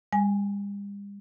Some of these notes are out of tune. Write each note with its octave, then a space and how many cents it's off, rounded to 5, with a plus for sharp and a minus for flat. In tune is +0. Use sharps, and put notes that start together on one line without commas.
G3 +45 G#5 +0